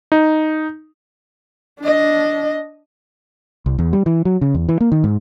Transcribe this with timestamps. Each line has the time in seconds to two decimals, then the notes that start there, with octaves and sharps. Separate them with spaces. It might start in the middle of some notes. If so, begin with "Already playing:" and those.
0.12 D#4
1.80 D4 D#5
3.66 C2
3.79 E2
3.93 G3
4.06 E3
4.25 F#3
4.41 C#3
4.55 E2
4.69 E3
4.81 A#3
4.92 D#3
5.04 G#2